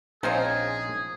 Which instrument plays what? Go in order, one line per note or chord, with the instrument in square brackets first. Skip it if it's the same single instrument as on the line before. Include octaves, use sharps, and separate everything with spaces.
[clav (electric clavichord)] A#1 D#4 F4 [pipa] F3 C4 C#4 [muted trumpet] G#4